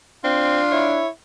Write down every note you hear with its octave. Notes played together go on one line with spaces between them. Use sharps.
C4 D4 F4
E4 C#5